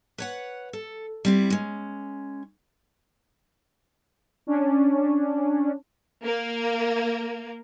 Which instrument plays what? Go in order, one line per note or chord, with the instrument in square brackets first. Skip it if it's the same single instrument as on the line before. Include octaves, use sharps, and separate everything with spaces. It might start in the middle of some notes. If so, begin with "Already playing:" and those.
[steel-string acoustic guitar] B4 C#5 F#5
A4
G3 C4 E4
G#3 C#4
[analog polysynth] C#4 D4
[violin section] A#3